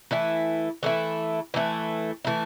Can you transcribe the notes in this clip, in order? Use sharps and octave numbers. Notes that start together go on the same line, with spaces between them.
E3 A3 E4
E3 A3 E4
E3 A3 E4
E3 A3 E4